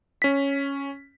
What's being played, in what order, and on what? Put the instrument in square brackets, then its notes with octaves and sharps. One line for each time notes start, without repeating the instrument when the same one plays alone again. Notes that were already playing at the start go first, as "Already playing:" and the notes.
[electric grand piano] C#4 B6